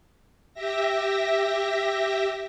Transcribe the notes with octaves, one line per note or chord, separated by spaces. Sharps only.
G4 E5 A#6